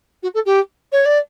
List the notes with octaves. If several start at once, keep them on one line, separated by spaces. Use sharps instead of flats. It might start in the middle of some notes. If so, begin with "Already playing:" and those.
F#4
A4
G4
C#5
D5